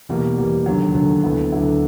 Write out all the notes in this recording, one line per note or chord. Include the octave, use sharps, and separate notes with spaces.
E2 B2 G3 A#3
E2 B2 G3 A#3
D#2 D3 F#3
D#2 D3 F#3
D2 D3 F#3 B3 E4
D2 D3 F#3 B3 E4